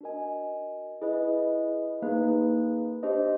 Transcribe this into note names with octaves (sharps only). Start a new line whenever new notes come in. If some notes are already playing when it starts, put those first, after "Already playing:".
D4 F#4 A#4 D#5 G#5
E4 G#4 B4 D#5
A#3 D#4 G#4 B4
D4 G4 C5 D#5